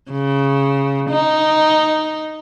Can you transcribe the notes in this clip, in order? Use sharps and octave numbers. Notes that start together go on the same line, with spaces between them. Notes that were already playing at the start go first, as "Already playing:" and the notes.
C#3
D#4